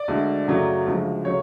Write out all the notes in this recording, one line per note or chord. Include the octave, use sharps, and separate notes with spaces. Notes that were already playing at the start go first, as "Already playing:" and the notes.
Already playing: D5
D2 D3 G#3
F#2 C#3 F#3 A3
D2 C#3 F3 G#3
C#3 F#3 A3 C#5